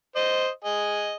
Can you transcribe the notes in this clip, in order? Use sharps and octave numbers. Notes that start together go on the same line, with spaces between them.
C5 D#5
G#4 D#5